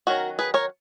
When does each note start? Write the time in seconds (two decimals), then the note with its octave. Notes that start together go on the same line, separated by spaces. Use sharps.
0.07 D#3 F#3 C#4 F#4 A#4
0.39 G#4 B4
0.54 A#4 C#5